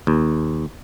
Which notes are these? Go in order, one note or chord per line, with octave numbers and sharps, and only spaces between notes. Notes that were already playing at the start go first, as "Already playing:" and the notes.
D#2